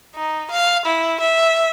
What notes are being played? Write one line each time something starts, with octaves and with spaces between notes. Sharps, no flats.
D#4
F5
E4
E5